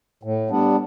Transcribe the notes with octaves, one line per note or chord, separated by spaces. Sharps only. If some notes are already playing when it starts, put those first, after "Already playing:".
A2
G3 B3 D4